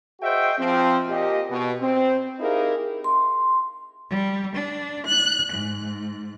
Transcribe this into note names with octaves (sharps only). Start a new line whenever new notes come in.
F#4 G#4 C5 D#5 E5 G5
F3 C4
A#2 G4 D#5
B2
C4
D#4 E4 G4 G#4 A#4 F5
C6
G3
D4
F#6
G#2